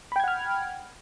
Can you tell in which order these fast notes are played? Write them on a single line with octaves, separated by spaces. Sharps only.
B5 G5 G#6 F#5 F6